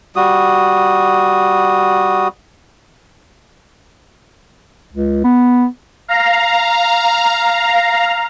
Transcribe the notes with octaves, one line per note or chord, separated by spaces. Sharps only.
G3 F#4 D#6
C#2
B3
F5 A#5